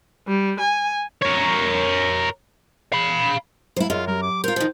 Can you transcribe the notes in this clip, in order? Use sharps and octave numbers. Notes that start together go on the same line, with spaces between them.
G3
G#5
A#4 C#5
F5 B5
F#3 A3 E4 C5 F5
F#2 F4 G#4 D#5 E5
F#3 G4 A#4
D6
F4 A#4 C5
D#3 F3